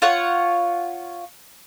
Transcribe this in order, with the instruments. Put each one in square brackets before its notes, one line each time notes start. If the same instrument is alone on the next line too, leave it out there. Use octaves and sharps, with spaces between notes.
[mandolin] F4 C#5 F#5